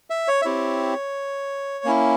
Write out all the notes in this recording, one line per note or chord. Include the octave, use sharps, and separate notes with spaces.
E5
C#5
E5
C4 E4 G4 C#5
A#3 C#4 E4